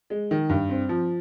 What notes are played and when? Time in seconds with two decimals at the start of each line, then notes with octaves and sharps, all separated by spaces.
0.10 G#3
0.31 D#3
0.49 G2
0.69 C4
0.89 F3